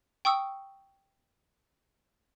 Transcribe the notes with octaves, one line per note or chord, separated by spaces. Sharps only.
G5 C#6 D#6 E6 C#7